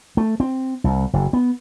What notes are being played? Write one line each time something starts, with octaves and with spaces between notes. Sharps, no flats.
A3
C4
C2
F#1
B3